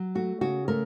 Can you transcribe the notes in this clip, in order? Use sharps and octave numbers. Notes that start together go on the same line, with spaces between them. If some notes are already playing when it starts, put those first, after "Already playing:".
Already playing: F#3
A3 F#4
C#3 F#4
A3 A#4